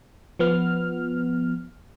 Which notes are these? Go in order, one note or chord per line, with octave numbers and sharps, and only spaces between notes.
F3 B3 F6